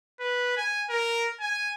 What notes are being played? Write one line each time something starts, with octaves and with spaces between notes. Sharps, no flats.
B4
G#5
A#4
G#5